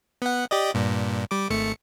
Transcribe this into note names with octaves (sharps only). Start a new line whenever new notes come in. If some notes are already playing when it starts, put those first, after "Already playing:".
B3 F#5
G4 D5 D#5
G2 A#2
G3 D6
G#1 A3 C#7